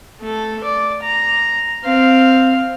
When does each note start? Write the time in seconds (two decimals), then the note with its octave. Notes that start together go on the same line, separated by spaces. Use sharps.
0.21 A3 A4
0.64 D5
1.03 A#5
1.84 C4 F5